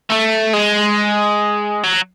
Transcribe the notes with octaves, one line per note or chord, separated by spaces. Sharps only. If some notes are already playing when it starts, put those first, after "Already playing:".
A3
G#3
F#3